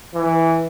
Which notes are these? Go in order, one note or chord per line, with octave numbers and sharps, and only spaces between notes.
E3